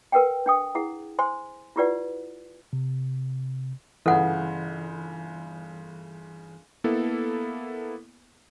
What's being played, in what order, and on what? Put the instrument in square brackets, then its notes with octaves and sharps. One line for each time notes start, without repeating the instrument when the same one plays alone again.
[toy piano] A#4 B4 F#5 G5
D4 G5 D#6
E4 G#4 F#5
C5 G#5 C6
E4 F4 G4 B4 D5 F#5
[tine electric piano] C3
[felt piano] G1 C#3 [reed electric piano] E3 [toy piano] A4 F#5
[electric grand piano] A#3 B3 E4 A4